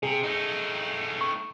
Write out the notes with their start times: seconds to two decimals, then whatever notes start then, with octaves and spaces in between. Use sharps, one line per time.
0.03 C3 G#4
0.23 A3 D#4
1.21 C#6